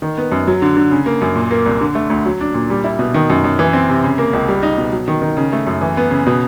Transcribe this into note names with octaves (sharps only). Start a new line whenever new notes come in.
D#3
B3
F#2
F#3
D3
D3
C#3
A#3
F#2
A#2
A#3
C2
D3
A3
D2
F#3
D4
A#2
G3
E4
B2
D#3
F#2
F#2
E3
C4
C3
C#3
A#3
C#2
G3
D#4
B2
F#3
D#3
D#3
C#3
A3
F#2
E3
B3
C#3
B2